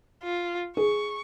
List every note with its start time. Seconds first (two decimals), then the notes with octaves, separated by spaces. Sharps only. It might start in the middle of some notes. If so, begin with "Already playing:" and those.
0.23 F4
0.77 G#4 C#6